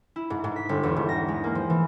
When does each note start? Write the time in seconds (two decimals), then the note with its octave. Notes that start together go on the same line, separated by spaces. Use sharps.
0.16 E4
0.30 G#2
0.44 G#2
0.56 B6
0.69 G1
0.83 E2
0.96 G#2
1.09 A#6
1.28 G#3
1.44 A#3
1.55 F3
1.70 E3